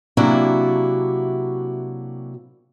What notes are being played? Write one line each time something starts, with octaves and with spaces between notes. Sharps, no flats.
C3 F#3 A#3 D4 E4 F#4